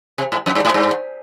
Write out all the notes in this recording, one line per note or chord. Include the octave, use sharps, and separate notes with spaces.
C3
G#2
F2
G2
G#2
G2